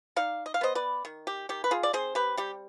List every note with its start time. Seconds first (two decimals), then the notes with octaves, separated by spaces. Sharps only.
0.16 D#4 D5 F5
0.46 D#5
0.54 F5
0.61 B3 C5 D#5
0.75 B4 D5
1.05 D#3
1.27 G4
1.49 D#3 G4
1.64 B4
1.71 F4 G#4
1.83 D5
1.93 C4 G#4 C5
2.15 G4 B4
2.37 G3 G4